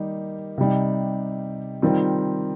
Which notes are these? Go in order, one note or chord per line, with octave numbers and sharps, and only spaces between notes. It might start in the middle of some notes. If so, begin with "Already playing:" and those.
Already playing: D#3 G3 A#3 D#4
C3 G3 D#4
D#3 G3 C4 F4